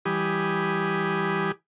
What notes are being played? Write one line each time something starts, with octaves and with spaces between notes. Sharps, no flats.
E3 G3 G4 G#5 B5 D#6